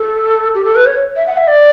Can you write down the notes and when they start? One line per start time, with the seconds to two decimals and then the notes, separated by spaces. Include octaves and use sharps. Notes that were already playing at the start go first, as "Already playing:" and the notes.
Already playing: A4
0.54 G4
0.65 A4
0.76 B4
0.86 C#5
1.16 E5
1.27 F#5
1.37 E5
1.48 D5